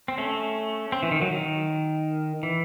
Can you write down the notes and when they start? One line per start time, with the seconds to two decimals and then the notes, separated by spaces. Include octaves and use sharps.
0.08 C4
0.18 A3 C#4
0.92 C4
1.03 E3
1.11 D#3
1.21 F#3
1.31 D#3
2.43 E3